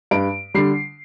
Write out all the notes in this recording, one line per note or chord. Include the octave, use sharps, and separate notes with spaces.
G2 D7
D3 G3 C7